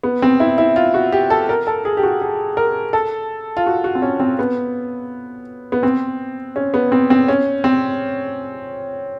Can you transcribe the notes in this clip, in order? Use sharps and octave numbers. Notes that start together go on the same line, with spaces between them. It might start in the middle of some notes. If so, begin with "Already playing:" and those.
B3
C4
E4
E4
F4
F#4
G4
A4
A#4
A4
G#4
G4
F#4
G#4
A#4
A4
F4
F#4
F#4
C4
C#4
C4
B3
B3
C4
C#4
B3
C4
C4
C#4
C4